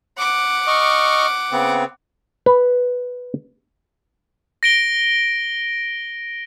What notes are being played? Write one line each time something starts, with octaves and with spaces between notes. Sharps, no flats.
F#5 D6
D#5 C#6 F6
C#3 B3 C4
B4
A#6 D7 G7